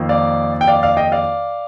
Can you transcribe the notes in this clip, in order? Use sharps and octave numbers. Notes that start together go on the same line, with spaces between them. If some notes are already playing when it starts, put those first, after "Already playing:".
Already playing: F2 D#3 A#3
D5 F5
G5
D5 F5
D5 F5
D#5 G5
D5 F5